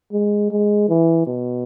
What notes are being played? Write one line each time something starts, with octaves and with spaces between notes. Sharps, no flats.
G#3
G#3
E3
B2